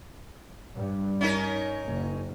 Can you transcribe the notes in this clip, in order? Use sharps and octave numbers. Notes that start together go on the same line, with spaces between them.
G2
C#4 D#4 A#4
F#1